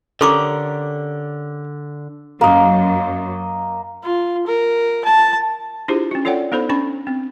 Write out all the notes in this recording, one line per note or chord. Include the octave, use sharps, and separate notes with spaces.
D3 C#4 G4 A4 A#4 C#6 D6
F#2 A#3 D#5
F4
A#4
A5
D4 E4 F4 G4 G#4 C5
C#4 F#4
F4 A4 C#5 D5 F#5 G5
B3 D#4 A4 C5 B5
C#4 D4 B5 C#6
C4